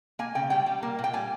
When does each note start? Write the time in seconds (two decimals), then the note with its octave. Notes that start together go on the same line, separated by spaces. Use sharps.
0.19 A#3 G#5
0.35 C#3 G5
0.50 G3 G5
0.66 G3
0.83 A#3
0.99 A#2
1.04 G5
1.13 G3 G#5